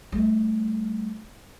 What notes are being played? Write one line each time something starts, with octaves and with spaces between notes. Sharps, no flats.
G3 A3